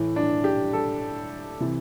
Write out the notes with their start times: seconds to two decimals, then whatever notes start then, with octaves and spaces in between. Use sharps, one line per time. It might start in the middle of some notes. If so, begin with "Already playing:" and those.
Already playing: A2 E3
0.16 D4
0.44 G4
0.73 A4
1.60 C3 E3